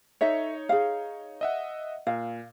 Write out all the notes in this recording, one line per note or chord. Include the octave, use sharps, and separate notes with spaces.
D#4 A4 C#5 E5
G#4 F5
D#5 E5 F#5
A#2 F5